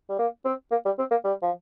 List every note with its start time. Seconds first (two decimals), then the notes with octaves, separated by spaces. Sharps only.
0.09 G3
0.19 A#3
0.45 C4
0.71 A#3
0.85 G3
0.98 C4
1.11 A#3
1.24 G3
1.42 F3